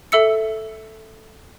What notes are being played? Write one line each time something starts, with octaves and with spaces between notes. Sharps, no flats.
A4 E5 E6 C#7